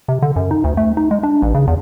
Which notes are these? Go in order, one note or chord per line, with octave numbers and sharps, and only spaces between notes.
C3
D3
F#2
D#4
D2
A3
D#4
G#3
D4
A1
C#3
E2